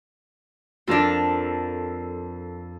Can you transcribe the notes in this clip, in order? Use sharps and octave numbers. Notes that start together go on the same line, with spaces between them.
F2 F3 D4 A4 A#4